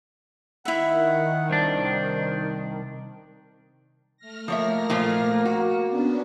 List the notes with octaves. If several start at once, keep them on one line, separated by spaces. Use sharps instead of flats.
D#3 E4 E5 F#5
C2 D4 C5
A3 F6 A#6
F3 A#3 C#5 E5
A#2 F3 F4
F#4
B3 C#4 D4